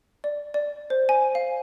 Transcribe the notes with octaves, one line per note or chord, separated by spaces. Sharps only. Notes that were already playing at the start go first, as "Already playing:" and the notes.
D5
D5
C5
G#5
F5